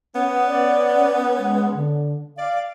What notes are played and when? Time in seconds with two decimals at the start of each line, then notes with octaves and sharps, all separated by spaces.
0.15 B3 C#4
0.48 D5
1.38 G#3
1.74 D3
2.38 D5 F5